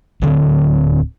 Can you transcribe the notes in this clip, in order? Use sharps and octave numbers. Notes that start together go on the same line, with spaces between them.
D1 D3 C4